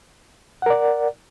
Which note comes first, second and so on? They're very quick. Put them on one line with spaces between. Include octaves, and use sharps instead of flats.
F#5 A#4 D5